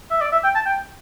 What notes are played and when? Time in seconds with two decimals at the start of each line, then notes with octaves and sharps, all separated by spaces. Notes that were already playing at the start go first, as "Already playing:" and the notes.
0.11 E5
0.21 D5
0.32 E5
0.44 G5
0.55 A5
0.66 G5